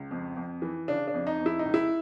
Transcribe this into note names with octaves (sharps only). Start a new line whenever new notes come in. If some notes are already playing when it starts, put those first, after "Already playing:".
Already playing: C#2
F2
F2
E3
C#3 D4
D4
F2
D#4
F2
E4
D#4
C#2
E4